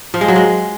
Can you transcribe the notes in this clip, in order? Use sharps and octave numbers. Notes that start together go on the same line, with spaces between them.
F3
G#3
F#3
G#3